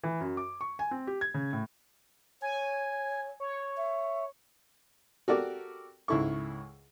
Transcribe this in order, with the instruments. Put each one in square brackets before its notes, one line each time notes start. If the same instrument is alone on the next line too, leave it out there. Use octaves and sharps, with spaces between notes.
[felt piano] E3
F#2
D6
C#6
G#5
C4
G4
G#6
C#3
A2
[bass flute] C#5 [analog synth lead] G#5
[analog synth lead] C#5
[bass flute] E5
[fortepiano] F#4 G4 A4 A#4 D5 D6
C#2 G#2 E4 A4 C#6